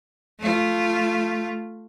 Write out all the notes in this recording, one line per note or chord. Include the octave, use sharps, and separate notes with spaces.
A3 F4